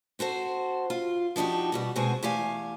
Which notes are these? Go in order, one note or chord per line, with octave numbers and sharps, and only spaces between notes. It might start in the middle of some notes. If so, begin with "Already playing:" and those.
C4 F#4 A4 C5
F4
F3 D4 D#4 F#4 G4
B2 G3 F#4
B2 G#3 C4 F#4 G#4
E2 A3 G4 F5 G#5